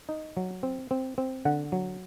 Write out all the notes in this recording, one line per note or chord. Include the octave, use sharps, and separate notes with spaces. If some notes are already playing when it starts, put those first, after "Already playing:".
D#4
F#3
C4
C4
C4
D3 F#5
F#3